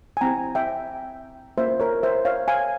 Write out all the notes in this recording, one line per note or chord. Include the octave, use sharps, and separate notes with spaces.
G#5
C4 E4 G4 G5 A#5
E5 G5
A#3 C#4 F4 C5 E5
A#4 C#5
C5 E5
C#5 F5
F5 G#5